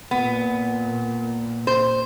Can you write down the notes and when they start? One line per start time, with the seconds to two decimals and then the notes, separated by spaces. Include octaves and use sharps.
0.11 A#2 B3
1.67 C5